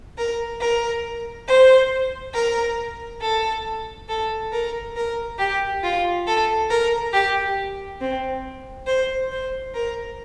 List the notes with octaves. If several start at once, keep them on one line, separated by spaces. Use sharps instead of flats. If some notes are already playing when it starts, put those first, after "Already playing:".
A#4
A#4
C5
A#4
A4
A4
A#4
A#4
G4
F4
A4
A#4
G4
C4
C5
C5
A#4